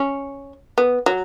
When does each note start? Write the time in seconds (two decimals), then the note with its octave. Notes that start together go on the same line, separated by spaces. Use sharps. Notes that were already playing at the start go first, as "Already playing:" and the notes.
Already playing: C#4
0.78 B3
1.06 F#3